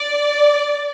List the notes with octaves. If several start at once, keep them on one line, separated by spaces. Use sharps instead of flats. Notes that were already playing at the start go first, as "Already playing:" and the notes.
Already playing: D5